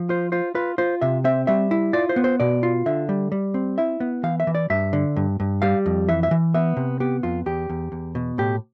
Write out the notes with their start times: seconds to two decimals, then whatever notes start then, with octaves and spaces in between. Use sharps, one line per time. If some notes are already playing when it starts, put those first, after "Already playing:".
Already playing: F3
0.09 F4 C5
0.32 F4 C5
0.55 F4 B4
0.78 F4 C5
1.01 C3 E5
1.24 C4 E5
1.47 G3 E5
1.71 E4
1.93 F4 D5
2.09 C5
2.16 B3
2.24 C5
2.40 B2 D5
2.63 F4
2.86 D3 E5
3.09 G3
3.32 G3
3.54 C4
3.78 E4 E5
4.00 B3
4.23 E3 F5
4.40 E5
4.47 E3
4.55 D5
4.70 G2 E5
4.93 D3
5.16 G2
5.40 G2
5.62 G3 F5
5.86 F2
6.08 E3 E5
6.23 E5
6.31 E3
6.54 B3 E5
6.77 C3
7.00 B3 G4
7.23 F2 F4
7.46 E2 G4
7.69 E2
7.92 E2
8.15 B2
8.38 A2 G4